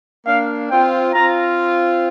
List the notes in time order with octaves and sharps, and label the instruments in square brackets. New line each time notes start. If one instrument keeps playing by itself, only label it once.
[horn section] A#3 D4 [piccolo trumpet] F5
[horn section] C4 F4 [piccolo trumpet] G5
[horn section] C4 F4 [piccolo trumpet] A#5